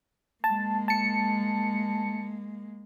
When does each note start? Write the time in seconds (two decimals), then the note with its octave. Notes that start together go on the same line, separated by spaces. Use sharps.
0.44 G#3 A#3 A5
0.88 A5 C#7